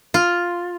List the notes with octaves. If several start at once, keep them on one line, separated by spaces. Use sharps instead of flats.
F4